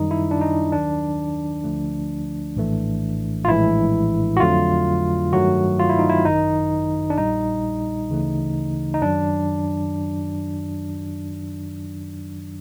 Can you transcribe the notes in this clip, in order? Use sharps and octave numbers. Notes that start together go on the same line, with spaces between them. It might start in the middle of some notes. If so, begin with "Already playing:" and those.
Already playing: F#2 D#3 G3 D#4
E4
D4
D#4
D#2 D#3 F#3 D4
D2 D3 F3 A3
A#1 A2 E3 A3
F4
A#1 A2 E3 G#3 E4
F#4
F2 D3 F#3 A3 F4
G2 D#3 F#3 A3 F#4
F4
E4
D#4
E4
G#1 F#2 D#3 D#4
D4
A#1 A#2 G3 D#4
D2 C#3 E3 A3
D#4
F#2 D#3 F#3 D4